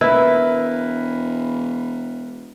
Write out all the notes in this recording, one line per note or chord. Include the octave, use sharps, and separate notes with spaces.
E1 E4 A#4 B4